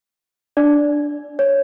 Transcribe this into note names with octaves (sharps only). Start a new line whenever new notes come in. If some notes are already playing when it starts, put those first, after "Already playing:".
D4 D5
C#5